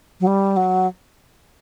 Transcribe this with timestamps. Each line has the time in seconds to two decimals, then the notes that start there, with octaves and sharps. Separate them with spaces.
0.20 F#3
0.27 G3
0.57 F#3